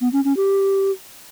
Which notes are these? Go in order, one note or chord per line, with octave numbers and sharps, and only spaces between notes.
B3
C#4
C#4
G4